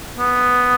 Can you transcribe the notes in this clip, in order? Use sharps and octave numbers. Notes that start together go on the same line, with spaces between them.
B3